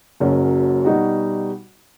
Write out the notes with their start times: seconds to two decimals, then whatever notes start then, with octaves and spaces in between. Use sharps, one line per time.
0.20 F#1 F#2 F#3
0.85 B2 G3 D#4 F#4